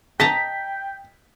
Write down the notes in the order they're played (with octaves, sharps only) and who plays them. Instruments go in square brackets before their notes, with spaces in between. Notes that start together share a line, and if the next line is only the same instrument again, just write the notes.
[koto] D#5 A5 A#5 [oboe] G5 [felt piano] B6